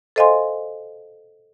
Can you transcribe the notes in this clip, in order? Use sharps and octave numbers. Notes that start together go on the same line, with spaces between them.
A4 C5 D#5 F5 G#5 C6